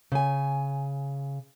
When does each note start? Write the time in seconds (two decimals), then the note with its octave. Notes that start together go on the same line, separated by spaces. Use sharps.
0.12 C#3 G#5